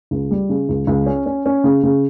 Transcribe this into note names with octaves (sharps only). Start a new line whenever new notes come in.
C#2
G3
C#3
C#2
C#2
C#4
C#4
C#4
C#3
C#3